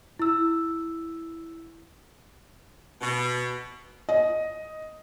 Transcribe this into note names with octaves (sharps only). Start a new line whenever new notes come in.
E4 E6
B2
D#5